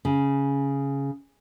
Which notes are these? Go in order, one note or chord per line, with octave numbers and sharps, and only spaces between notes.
C#3